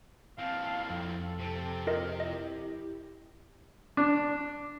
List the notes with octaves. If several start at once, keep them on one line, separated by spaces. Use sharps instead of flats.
E3 C4 F5 A5
F2 A4
C3 C4
F4 A#4 D#5
E4 G4 D#5
D4